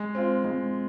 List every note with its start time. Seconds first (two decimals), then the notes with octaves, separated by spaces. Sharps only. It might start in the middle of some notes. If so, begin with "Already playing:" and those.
Already playing: G#3
0.15 C4 F4
0.44 G#3